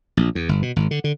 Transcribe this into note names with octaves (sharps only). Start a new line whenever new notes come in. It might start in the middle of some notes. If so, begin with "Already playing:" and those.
A#1
E2
G1
B2
G#1
D3
D3